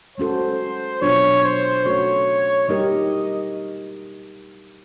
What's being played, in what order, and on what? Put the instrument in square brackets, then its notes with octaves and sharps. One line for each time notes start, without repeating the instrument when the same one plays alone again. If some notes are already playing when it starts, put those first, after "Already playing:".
[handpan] G#3 C#4 F#4 A4 [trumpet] C5
[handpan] B2 F#3 B3 D4 F4 [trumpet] C#5
[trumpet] C5
[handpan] A3 C#4 F#4 A4 [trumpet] C#5
[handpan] G3 A#3 D#4 G4 A#4 [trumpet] D#5